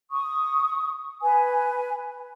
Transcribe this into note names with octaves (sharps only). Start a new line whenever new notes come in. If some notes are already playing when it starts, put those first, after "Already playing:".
C#6 D#6
B4 G#5